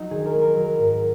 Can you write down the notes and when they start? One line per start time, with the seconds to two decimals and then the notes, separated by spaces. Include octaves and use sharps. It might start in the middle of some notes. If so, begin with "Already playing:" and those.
Already playing: F#3 D#4 F#4
0.10 D#3 G#4
0.26 A#4
0.33 G#3
0.41 A#4
0.56 F#3
0.79 G#2